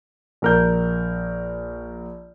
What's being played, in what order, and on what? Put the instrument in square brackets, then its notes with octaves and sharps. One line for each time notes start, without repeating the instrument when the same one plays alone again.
[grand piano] A#1 A#4 G6